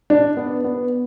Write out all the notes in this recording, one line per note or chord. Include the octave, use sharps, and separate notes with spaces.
D4
B3
B3